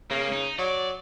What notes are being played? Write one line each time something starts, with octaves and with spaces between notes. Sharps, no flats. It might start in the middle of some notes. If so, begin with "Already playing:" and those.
C#3 A#3
D#4
F#3 D5